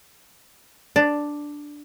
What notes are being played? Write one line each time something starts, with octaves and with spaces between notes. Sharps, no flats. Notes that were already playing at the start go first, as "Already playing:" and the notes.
D4